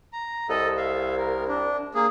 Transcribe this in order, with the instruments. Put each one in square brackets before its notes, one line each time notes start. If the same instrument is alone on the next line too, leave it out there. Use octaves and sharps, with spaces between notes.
[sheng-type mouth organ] A#5
[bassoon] C2 [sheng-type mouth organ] A4 D#5
[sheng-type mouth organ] E5 F5
A#4
D4
A#3 G#4